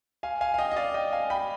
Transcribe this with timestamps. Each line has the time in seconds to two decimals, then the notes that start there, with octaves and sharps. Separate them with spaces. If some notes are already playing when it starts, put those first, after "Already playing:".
0.23 F5 G#5
0.41 F5 G#5
0.54 F5
0.59 D#5 G5
0.72 D#5
0.76 D5 F5
0.94 D#5 G5
1.12 F5 G#5
1.30 G5 B5